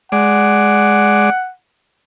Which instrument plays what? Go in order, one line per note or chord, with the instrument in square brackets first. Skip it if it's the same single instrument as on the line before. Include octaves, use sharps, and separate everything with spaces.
[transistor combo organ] G#3 D5 [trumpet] F#5